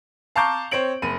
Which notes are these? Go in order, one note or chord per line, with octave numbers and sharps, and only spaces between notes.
F5 A5 A#5 C#6 D6 G6
C4 C5 C#5 D7 F#7
F#1 B5 D#7